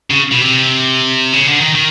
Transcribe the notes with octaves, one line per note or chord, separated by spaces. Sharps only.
C#3
B2
C3
C#3
D3
D#3
D#3